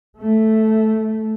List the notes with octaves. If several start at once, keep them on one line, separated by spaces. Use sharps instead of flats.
A3